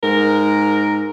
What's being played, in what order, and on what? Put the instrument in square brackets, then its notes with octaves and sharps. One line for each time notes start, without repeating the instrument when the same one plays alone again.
[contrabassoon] G#2 [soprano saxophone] A#4